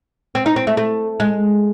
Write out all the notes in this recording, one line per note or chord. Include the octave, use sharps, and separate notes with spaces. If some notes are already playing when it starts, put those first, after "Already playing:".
C4
D#4
C4
A3
A3
G#3